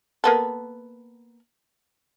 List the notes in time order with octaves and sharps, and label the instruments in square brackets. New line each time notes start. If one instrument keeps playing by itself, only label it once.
[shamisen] A#3 B3 A4